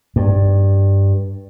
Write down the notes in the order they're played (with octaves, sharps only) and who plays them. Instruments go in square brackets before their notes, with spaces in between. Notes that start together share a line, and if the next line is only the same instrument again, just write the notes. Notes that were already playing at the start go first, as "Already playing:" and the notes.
[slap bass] G2